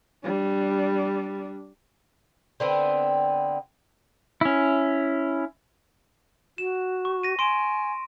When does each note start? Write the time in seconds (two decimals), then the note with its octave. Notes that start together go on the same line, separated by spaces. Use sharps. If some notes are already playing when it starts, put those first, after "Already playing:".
0.24 G3 D4
2.60 D3 B3 C4
4.41 C#4 E4
6.58 F#4 E7
7.05 C#6
7.23 A#6 D#7
7.39 G#5 C6 D7 E7